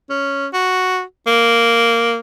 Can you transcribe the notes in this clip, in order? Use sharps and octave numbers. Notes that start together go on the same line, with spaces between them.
C#4
F#4
A#3